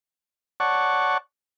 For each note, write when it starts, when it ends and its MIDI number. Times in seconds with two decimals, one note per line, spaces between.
0.60 1.18 73
0.60 1.18 74
0.60 1.18 78
0.60 1.18 81
0.60 1.18 85